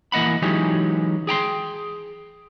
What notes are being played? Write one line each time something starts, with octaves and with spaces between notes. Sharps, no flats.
E3 A#3 D#5 F#5 B5
E3 F#3 G#3 C#4 D#4 G4
G#4 G5 A#5 C6